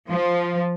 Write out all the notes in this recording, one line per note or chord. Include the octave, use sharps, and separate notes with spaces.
F3